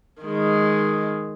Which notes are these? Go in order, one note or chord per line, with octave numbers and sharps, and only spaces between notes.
D#3 G#3